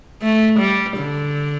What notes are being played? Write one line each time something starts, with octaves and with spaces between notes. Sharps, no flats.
A3
G3
D3